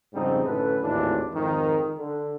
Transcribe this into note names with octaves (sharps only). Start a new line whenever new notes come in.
F2 G#2 C#3 G3 C4 D#4
F#2 A2 D3 E3 A4 B4
G#1 D#2 A2 E3 D4
G#1 F2 G#2 D#3
D3